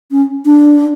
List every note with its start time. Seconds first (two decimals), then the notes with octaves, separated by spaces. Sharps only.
0.11 C#4
0.45 D4